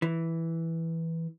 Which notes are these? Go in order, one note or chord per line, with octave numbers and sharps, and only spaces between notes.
E3